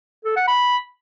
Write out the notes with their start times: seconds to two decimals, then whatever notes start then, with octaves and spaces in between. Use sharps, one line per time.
0.25 A4
0.36 F#5
0.48 B5